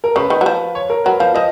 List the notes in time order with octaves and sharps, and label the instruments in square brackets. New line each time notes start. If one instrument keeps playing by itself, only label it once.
[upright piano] A#4
[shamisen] C#3 [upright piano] B4
[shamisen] D#3
F#3
F3
[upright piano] C#5
A#4
[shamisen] F#3 [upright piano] B4
[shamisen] F3 [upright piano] F5
[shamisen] F3 [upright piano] D#5